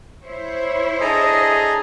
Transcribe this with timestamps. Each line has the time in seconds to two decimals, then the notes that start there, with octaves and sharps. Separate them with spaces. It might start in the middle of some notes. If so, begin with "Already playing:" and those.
0.24 E4 C5 C#5
1.01 D4 G#4 A4 D#5 G#5 A#5